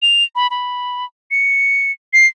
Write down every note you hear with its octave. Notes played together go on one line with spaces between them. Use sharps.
F7
B5
B5
C#7
C7